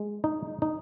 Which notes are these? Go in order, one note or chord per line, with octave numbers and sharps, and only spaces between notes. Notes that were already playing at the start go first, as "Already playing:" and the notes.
Already playing: G#3
D#4
D#4